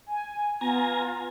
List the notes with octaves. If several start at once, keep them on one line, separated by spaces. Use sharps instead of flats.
G#5
B3 F4 G#5 A#5